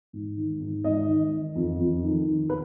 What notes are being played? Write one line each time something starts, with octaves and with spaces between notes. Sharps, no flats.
G#2
D#3
G#2
G#2 D#5
D#3
D#3
F2
F2
D#3
D#3
B4